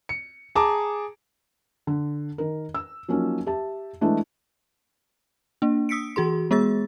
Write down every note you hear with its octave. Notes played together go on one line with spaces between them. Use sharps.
C#7
G#4 A5 A#5 D6
D3
D#3 A#4
E6
F3 F#3 A#3 C#4 D#4
G4 E5 A5
E3 G#3 A3 D4 E4
A#3 D4
D#6 E6 B6 C#7 D7
E3 F#4 G#4 C6
G#3 B3 G#4 E6 A6